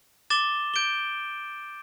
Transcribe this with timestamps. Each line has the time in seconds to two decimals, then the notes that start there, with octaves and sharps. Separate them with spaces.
0.30 D6 A6 E7 G7
0.74 G6 D7 G7